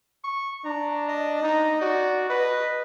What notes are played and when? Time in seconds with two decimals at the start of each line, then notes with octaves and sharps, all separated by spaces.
0.24 C#6
0.65 D4 A#5
1.08 D#5
1.43 D#4
1.81 F#4 D5
2.29 B4 D#5